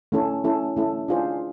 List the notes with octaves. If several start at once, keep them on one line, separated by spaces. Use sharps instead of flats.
A3 C#4 E4 A4
A3 C#4 E4 A4
A3 C#4 E4 A4
D4 F4 G#4 C5